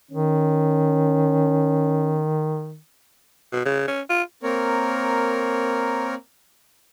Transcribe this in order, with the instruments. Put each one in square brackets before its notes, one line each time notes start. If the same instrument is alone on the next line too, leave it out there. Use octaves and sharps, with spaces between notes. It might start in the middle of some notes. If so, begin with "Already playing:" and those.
[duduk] D#3 [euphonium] C#4
[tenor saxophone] B2
C#3
C#4
F4
[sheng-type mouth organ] A#3 C4 A#4 C#5